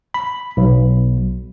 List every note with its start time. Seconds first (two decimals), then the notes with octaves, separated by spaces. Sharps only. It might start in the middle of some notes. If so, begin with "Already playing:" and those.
0.14 B5
0.57 B1